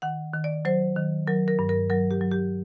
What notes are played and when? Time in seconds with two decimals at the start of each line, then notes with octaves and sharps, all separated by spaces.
0.02 D#3 F#5
0.33 D#3
0.44 D5
0.65 F#3 C5
0.96 D#3
1.27 F#3 A#4
1.48 A#4
1.59 G2
1.69 A#4
1.90 F#3 A#4
2.11 G4
2.21 F#3
2.31 G4